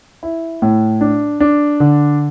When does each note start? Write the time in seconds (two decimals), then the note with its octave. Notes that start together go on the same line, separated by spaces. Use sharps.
0.23 E4
0.62 A2
1.01 D4
1.40 D4
1.80 D3